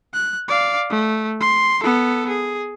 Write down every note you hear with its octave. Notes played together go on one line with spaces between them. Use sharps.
F#6
D5 F5
A3
C6
B3 A4
G#4